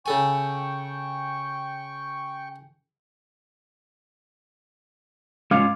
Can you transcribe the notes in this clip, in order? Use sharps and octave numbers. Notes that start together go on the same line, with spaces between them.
C#3 A4 G5 G#5 C#6
G#3 C#4 F4 F5 D6 F6